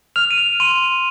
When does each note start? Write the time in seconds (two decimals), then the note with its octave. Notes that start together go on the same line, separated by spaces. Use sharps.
0.16 F6 F7
0.31 D#7
0.38 F7
0.60 C6 D#7